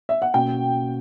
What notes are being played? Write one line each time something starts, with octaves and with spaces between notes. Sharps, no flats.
E5
F#5
B2 A#3 C#4 F#4 G5